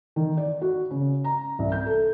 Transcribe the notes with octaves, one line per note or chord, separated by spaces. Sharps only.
D#3
D5
F#4
C#3
A#5
C2
G6
A4